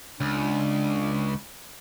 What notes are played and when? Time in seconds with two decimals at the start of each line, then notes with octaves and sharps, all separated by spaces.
0.20 C#2 D4